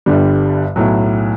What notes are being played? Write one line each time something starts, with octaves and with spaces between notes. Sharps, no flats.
G1 G2 D3 G3
B1 A2 F#3